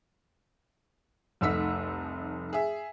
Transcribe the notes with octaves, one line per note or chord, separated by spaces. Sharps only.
F1 C2 A3 D#4 E6 B6
G#4 E5